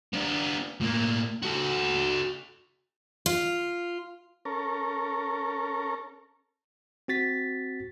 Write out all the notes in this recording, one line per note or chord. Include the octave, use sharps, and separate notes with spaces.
B3 D4
A2 A#3
F#4 A4
F4
C#4 A4 A#4
C4 F#4 A6 B6